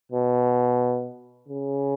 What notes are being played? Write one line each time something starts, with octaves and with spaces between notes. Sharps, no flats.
B2
C#3